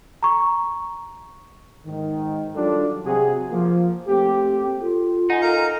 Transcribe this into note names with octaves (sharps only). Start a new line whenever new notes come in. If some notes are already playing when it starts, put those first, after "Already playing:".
A#5 C#6
G#2 D#3
D#3 F#3 G3 D4 F4 A4
C3 F#3 F#4 G#4
F3 A#3
A3 A#3 C4 G4
F4 A4
D#4 F#5 G#5
A4 A#4 F5 G#5 A#5